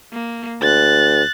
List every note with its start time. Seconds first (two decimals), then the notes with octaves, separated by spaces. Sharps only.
0.13 A#3
0.61 D2 F#6 A6